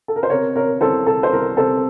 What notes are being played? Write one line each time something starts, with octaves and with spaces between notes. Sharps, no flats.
A4
A#4
C5
C3 A#4 C#5
C3 A#4 C#5
C2 A4 C5
C2 A4
C5
C2 A#4
C3 A4 C5